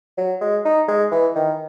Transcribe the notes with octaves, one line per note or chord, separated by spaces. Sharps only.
F#3
G#3
D#4
G#3
E3
D#3